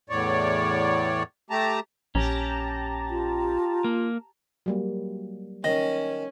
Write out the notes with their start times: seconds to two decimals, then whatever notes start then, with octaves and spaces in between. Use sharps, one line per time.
0.10 E2 A2 C#5 D5
1.50 A3 G4 A5 A#5
2.15 A#1 C#4 G4 A5 A#5
3.10 F4
3.84 A#3
4.66 F#3 G3 A#3
5.64 D#3 C#4 D#5